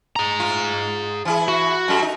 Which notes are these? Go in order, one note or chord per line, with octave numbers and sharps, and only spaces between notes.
G#4 A#5
F4
E3 E4 G#4
F#4
F#2 G3 A4
D#4